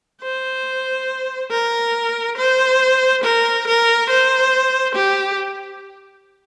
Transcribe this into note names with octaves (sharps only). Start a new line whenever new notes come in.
C5
A#4
C5
A#4
A#4
C5
G4